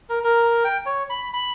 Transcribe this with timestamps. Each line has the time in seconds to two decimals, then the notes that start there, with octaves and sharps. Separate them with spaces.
0.10 A#4
0.24 A#4
0.64 G5
0.86 C#5
1.10 B5
1.33 B5